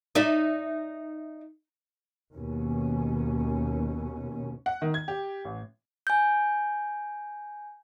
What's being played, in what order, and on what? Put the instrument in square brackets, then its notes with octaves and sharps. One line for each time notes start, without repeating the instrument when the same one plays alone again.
[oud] D#4 D5 E5
[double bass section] D#2 B2 C#4
[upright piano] F#5
D#3
G#6
G4
A1
[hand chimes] G#5 G6